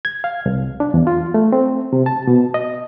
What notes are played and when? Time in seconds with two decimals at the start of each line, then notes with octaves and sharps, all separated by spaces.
0.05 G#6
0.24 F5
0.46 C2
0.80 D4
0.94 E2
1.07 F4
1.34 A3
1.52 C4
1.93 C3
2.06 A5
2.27 B2
2.54 D#5